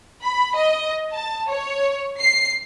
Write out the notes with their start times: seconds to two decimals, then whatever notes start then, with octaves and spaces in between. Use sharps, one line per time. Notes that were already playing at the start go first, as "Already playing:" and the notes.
0.23 B5
0.55 D#5
1.13 A5
1.48 C#5
2.19 C7